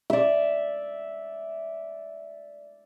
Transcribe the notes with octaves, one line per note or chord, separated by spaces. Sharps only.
D5 E5